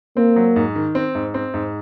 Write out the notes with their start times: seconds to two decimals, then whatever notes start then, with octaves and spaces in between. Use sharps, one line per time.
0.17 A#3 C4
0.36 F#3
0.56 G#2
0.76 D#3
0.95 C4
1.15 G#2
1.34 C4
1.54 G#2